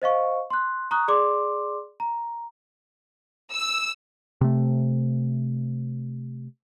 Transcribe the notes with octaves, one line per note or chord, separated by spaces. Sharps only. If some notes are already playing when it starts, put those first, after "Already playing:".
C5 D#5 F5 C#6
C6 F#6
A#5 C#6 D#6 F#6
G#4 D5 C6 D6
A#5
E6
C3 A3